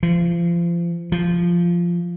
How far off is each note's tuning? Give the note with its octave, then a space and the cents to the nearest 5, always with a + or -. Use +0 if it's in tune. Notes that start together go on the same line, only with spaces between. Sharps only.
F3 -30
F3 -10